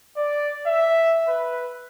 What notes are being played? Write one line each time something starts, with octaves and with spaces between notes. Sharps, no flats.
D5
E5
B4